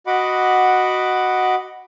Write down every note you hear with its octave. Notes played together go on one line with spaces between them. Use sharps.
F#4 D#5 F#5 B5 D6